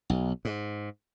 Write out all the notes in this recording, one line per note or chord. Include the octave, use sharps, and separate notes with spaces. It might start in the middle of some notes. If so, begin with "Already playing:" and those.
B1
G#2